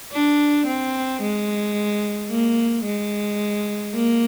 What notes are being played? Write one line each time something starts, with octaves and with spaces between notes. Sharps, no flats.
D4
C4
G#3
A#3
G#3
A#3